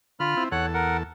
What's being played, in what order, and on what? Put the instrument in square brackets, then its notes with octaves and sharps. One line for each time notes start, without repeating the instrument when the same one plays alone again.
[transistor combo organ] D3 [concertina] F4 B5 F6
[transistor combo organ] C4 E4
[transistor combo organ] E2 A4 [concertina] C#5 F#5 F#6
[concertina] A#4 F#5